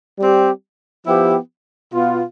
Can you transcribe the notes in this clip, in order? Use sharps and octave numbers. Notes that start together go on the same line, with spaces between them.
G3 C4 G4
F3 B3 E4 G4
B2 B3 F4